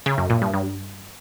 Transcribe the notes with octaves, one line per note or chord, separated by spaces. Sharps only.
C#3
F#2
A#2
G2
G2